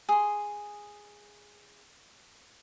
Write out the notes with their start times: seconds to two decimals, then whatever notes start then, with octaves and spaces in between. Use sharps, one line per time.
0.09 G#4 C6